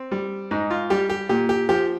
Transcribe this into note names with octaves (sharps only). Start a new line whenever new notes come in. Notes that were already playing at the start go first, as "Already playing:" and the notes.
Already playing: C4
G3
G#2 D#4
F4
G3 G4
G4
A#2 G4
G4
F3 G4